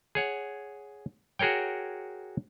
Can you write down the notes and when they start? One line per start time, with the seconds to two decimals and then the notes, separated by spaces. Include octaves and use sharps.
0.15 G#4 C#5 F#5
1.39 F#4 G#4 A#4 C#5 G5